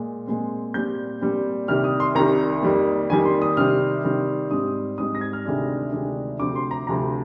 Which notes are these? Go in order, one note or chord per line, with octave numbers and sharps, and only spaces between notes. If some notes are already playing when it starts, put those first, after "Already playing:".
Already playing: A#2 G#3
A#2 G#3 C4
A#2 G3 C4 G6
A#2 G3 C4
C2 C3 D#3 G3 F6
D#6
C6
C2 C3 D#3 G3 A#5
F2 D#3 G3 A#3
F2 D#3 G3 A#3 G#5
C6
D#6
C3 D#3 G3 C4 F6
C3 D#3 G3 C4
G#2 G3 C4 D#6
G#2 G3 C4 D#6
A#6
G#6
F6
D2 C3 D#3 G#3 D4
D2 C3 D#3 G#3 D4
D2 C3 F3 C4 D6
C6
A#5
D2 C3 F3 C4 A#5